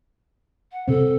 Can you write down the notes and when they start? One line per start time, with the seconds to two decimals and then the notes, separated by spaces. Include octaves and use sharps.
0.72 F#5
0.88 C3 C4 A4